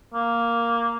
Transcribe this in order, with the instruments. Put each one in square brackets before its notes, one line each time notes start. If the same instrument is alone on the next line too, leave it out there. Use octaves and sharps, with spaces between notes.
[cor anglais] A#3